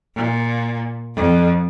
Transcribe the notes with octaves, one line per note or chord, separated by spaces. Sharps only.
A#2
F2